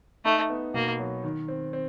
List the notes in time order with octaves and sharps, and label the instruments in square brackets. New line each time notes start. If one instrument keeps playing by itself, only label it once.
[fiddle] A3 [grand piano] D#4
[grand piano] B3
[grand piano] B2 [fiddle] A#3
[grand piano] F#3
D#3
C4
C4